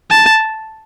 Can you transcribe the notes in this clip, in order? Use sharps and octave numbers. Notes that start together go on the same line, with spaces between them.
A5